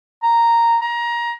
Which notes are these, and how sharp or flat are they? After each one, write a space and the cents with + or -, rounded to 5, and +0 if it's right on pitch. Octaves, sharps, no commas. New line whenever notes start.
A#5 -5
A#5 +25